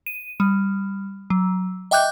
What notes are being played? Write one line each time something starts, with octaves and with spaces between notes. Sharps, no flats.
D#7
G3
F#3
D#5 E5 G5 D6 F#6 G6